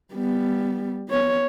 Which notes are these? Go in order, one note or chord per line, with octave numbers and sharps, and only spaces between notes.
G3 B3
B3 C#5